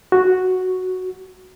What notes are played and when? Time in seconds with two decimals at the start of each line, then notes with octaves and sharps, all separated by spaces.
0.12 F#4